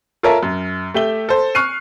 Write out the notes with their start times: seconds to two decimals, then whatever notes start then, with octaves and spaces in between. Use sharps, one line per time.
0.23 F4 A4 A#4 C#5 E5 A5
0.43 F#2
0.94 A3 G4 E5 G7
1.29 A4 C5
1.55 C#6 F6 F#6 C7 D#7